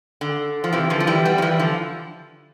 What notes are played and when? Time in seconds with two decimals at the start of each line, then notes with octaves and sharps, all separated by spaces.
0.21 D3
0.64 F3
0.73 C3 E3
0.90 D3 F3
1.00 F3
1.07 E3 G3
1.25 G3 B3
1.38 F3
1.42 E3 G3
1.59 D3 F3